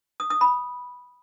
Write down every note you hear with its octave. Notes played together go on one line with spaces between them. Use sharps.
D#6
D#6
B5